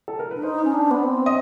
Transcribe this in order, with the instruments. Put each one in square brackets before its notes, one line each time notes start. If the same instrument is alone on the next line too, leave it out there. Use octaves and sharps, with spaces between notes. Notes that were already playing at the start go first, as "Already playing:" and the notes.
[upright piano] A4
A#4
B4
[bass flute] D4
[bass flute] D#4 [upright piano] C5
[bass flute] C#4
D4
B3
C4
[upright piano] D#5